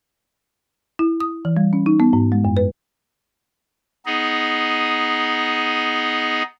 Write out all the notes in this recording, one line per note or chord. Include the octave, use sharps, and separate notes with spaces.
E4
D#6
E3
G3
C#4
D#4
B3
G#2
G#3
F#2
B4
B3 D#4 G#4 D#5